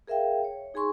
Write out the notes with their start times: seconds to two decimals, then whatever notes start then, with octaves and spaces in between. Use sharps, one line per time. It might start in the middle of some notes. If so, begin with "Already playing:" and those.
0.07 G#4 A#4 E5 F5 G5
0.44 C#5
0.74 D#4 G#4 G#5 C6 C#6